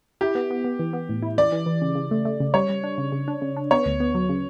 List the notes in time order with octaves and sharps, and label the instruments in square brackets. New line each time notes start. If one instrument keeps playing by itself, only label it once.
[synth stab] E4 [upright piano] G4
[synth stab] B3
B3
B3
E3
B3
A2
E4
[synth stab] E3 [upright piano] D5
[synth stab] E3
E3
C#3
C#3
A3
A3
C#3
[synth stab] G3 [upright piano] C#5
[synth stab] G3
D4
C#3
C#3
D4
C#3
D4
[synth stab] B3 [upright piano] C#5
[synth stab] D2
B3
F#3
C#3